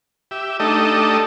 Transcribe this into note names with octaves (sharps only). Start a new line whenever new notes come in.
G4 E5
A3 D4 D#4 G4 A4 D#5